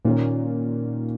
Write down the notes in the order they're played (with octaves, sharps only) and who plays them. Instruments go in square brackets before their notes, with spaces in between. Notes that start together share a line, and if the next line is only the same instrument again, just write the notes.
[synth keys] A#2 [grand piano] D#3 A#3 C#4